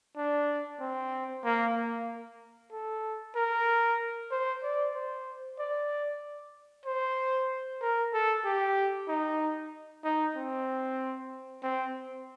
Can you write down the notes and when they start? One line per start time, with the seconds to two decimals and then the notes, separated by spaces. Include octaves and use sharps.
0.17 D4
0.80 C4
1.44 A#3
1.76 A#3
2.72 A4
3.36 A#4
4.31 C5
4.63 D5
4.95 C5
5.59 D5
6.85 C5
7.81 A#4
8.13 A4
8.45 G4
9.09 D#4
10.04 D#4
10.36 C4
11.63 C4